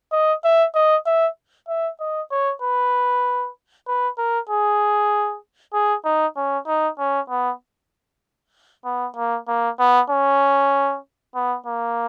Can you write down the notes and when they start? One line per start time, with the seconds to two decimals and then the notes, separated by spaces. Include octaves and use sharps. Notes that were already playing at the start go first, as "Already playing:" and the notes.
0.12 D#5
0.44 E5
0.75 D#5
1.06 E5
1.68 E5
2.00 D#5
2.31 C#5
2.62 B4
3.87 B4
4.18 A#4
4.50 G#4
5.73 G#4
6.05 D#4
6.37 C#4
6.67 D#4
6.99 C#4
7.30 B3
8.85 B3
9.16 A#3
9.48 A#3
9.79 B3
10.10 C#4
11.35 B3
11.66 A#3